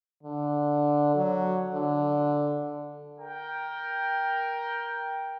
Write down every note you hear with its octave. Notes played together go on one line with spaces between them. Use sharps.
D3
F#3
D3
A#4 G5